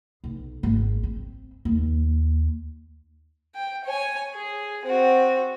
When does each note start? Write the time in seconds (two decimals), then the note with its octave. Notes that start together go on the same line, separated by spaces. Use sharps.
0.24 B1
0.63 G#1
1.03 C4
1.65 D#2
3.55 G5
3.85 C#5 G#5
4.34 G#4
4.85 C4 F#4